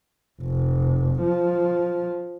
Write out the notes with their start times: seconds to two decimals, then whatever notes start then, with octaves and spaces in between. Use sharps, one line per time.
0.42 F1
1.22 F3